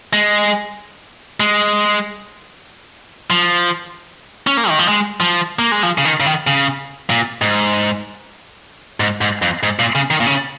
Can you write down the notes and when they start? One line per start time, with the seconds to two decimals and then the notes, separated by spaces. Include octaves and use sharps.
0.13 G#3
1.40 G#3
3.30 F3
4.47 C#4
4.57 A#3
4.69 D#3
4.79 F3
4.88 G#3
5.20 F3
5.59 A#3
5.72 G#3
5.83 F3
5.98 C#3
6.05 D#3
6.20 C#3
6.26 D#3
6.47 C#3
7.10 A#2
7.41 G#2
9.00 G#2
9.21 G#2
9.42 F2
9.63 G#2
9.79 A#2
9.95 C#3
10.11 D#3
10.20 A#2
10.26 C#3